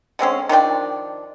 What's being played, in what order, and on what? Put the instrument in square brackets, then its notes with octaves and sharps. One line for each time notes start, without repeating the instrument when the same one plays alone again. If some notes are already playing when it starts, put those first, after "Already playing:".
[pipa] D3 G#3 C4 C#4
D#3 F3 D4 G5